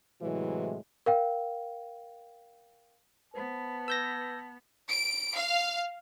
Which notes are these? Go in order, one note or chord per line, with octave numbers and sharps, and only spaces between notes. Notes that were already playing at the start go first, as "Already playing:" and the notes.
A2 C3 E3 F#3 G#3
A#4 F5 G5
B3 B4 C5 A5 B5
B4 E6 G6 A#6
D7
F5